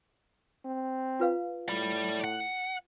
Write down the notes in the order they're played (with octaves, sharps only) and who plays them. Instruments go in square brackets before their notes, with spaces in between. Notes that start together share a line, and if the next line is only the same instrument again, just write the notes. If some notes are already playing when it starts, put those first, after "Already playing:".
[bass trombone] C4
[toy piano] F4 B4 F5
[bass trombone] A2 [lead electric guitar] D5 B5
[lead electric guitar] F#5